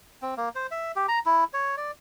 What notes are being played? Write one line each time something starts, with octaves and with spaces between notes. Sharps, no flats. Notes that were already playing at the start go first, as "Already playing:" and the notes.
C4
A#3
C5
E5
G4
A#5
E4
C#5
D5